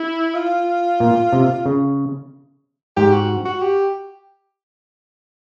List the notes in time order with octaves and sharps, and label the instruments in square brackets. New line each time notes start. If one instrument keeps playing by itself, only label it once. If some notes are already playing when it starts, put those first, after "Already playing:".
Already playing: [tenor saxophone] E4
F4
[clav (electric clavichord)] A#2
C3
C#3
[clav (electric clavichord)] G#2 [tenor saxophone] G4
[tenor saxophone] F#4
F#4
G4